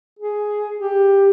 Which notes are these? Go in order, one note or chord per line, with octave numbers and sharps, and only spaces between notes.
G#4
G4